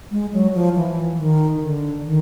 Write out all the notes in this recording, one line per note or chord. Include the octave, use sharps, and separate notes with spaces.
G#3
F#3
F3
E3
D#3
D3
D#3